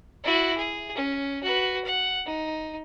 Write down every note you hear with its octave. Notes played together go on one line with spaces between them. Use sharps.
E4 F#4
G#4
C#4
F#4 B4
F#5
D#4